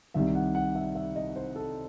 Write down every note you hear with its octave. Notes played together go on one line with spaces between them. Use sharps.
C2 C3 D#3 G3 E5
F#5
F#5
E5
E5
D#5
C5
A4